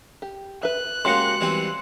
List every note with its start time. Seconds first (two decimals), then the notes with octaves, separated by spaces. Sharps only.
0.22 G4
0.63 B4 E5 F#6
1.05 C#3 G#3 A#3 F#4 G4 C6 C#7
1.41 E3 G3 C4